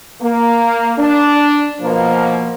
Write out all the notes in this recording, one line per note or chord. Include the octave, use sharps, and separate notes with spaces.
A#3
D4
B2 F3 A#3